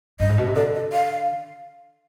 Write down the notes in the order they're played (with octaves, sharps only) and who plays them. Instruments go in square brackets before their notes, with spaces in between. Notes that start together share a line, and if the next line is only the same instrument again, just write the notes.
[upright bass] G2 [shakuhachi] D#5
[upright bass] G#2
B2
C3
[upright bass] D3 [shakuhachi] D5
[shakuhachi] D#5
F5